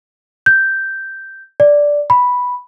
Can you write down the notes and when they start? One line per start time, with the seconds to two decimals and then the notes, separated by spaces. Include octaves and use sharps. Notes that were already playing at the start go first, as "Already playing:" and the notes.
0.46 G6
1.60 D5
2.10 B5